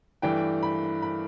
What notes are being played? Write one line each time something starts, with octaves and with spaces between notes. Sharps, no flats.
G2 E3 A3 D4 G5
B5
B5